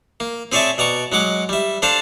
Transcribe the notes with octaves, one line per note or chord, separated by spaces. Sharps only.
A#3
C4 G#4 C#5 D5 E5 A5
B2 D5 A#5 C#6
F#3 G#3 F#5 D6
G3 E5
D4 A4 C5 D5 F5 A5